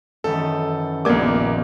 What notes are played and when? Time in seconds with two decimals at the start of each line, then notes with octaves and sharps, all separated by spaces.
0.24 F#2 D#3 E3 A4
1.05 A#1 D#2 A#3 B3 A#4 D5 D6